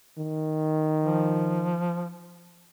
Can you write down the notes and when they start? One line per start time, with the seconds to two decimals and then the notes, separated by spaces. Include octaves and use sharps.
0.18 D#3
1.05 F3